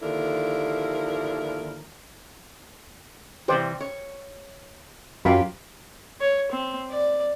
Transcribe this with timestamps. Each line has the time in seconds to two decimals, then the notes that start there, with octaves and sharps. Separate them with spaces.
0.02 D#2 D3 F3 E4 A#4
3.48 C3 E3 G3 G4 C5 D5
3.80 C#5
5.25 F#2 C#4 F4 G4 A#4 F5 B5
6.21 C#5
6.52 C4
6.90 D5